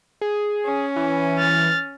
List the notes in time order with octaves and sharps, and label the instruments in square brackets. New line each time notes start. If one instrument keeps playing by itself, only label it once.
[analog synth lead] G#4
[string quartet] C#4
[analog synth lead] E3
[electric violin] F6 A6